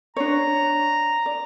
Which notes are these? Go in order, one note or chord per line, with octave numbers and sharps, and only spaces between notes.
D4 C#5 A#5
D5